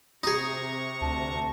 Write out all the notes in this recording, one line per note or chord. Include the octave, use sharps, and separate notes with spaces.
C3 D#4 G#4 A#5 C#6
D2 A5